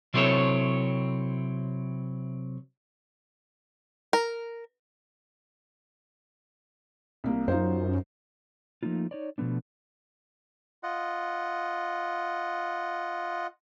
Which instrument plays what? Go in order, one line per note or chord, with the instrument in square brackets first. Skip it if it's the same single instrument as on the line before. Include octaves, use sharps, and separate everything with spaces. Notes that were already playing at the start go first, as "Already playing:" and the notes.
[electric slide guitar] C3 F#3 C4 E4 A4 C#5
[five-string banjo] A#4
[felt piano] C2 A#3
[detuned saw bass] F#2 [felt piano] D#4 F4 C5
[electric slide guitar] F3 A3 A#3 D#4 F4
D#4 C#5 D5
B2 F3 A3 B3 D4
[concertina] F4 D#5 F#5